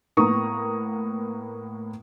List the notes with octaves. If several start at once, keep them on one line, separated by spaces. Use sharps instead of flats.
A2 A#3 B3 A#5 C#6 D#6